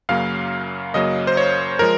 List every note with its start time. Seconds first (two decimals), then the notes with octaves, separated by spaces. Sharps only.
0.09 F#2 C#3 F#3 A#3 F5
0.94 F#2 C#3 F#3 A#3 D#5
1.27 C5
1.37 C#5
1.79 F3 G#3 A#4